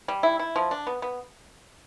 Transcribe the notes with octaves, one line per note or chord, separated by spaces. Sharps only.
G3
E4
E4
F3
D4
B3
B3